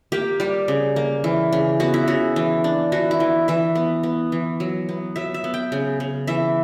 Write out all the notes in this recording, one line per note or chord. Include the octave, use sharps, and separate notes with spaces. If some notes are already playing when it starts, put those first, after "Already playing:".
A#3 G4
G3 G4
C#3
A#3
E3
C#3
B3 F#4
E4
C#3 F#4
E3
D4
E3 F#4
E4
E3
E3 E5
B3
B3
E3
F#3
B3
F#3 E5
E5
B3
G5
C#3
C#3
E3 E5